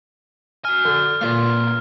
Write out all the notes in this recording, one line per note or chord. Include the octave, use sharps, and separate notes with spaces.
F#4 G#5 F6
D3
A#2 A#3 F4 B4 F5